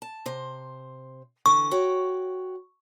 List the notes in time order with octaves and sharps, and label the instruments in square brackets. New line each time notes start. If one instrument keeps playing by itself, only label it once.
[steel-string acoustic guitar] A5
C3 C5
[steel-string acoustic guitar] D3 E3 [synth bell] C#6
[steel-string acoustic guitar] F#4 C#5 G5